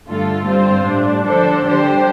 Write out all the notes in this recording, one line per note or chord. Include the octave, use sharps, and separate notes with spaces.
G2 D3 A3 F4 A4
G2 G3 C4 F4 C5
A2 G3 D4
D3 F3 D4 A4 C5
D3 G3 D4 G4 C5